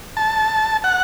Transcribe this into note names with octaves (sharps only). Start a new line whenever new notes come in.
A5
F#5